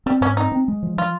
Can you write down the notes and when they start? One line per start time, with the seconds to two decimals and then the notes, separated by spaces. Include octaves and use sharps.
0.06 G3 C4
0.21 G#2 C#4
0.37 C4 D#4
0.52 C4
0.68 G#3
0.83 F3
0.98 F3 F4